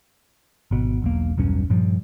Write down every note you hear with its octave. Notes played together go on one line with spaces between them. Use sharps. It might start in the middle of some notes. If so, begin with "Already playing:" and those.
G#1 B2
E1 B1 A#3
E1 B1 G2 C#4
G2 A#2 F3 G3